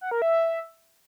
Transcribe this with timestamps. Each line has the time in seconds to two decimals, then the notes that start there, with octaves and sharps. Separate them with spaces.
0.01 F#5
0.11 A#4
0.22 E5